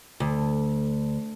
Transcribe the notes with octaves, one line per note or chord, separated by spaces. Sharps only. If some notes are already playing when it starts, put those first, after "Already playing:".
D2